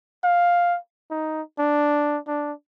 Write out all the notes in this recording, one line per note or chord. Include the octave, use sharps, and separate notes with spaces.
F5
D#4
D4
D4